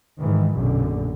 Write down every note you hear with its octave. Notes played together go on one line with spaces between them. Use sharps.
G#2 D#3 E3
A#1 F#2 B2 D3